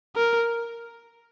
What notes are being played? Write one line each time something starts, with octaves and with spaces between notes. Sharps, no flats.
A#4